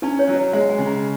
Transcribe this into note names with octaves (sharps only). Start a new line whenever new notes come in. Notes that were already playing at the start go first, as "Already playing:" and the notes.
C#4 E4
C#5
F#3
D#5
G#3 E5
G#5
C#3
A#5